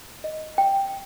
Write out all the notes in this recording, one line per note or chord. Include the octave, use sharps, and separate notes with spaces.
D#5
G5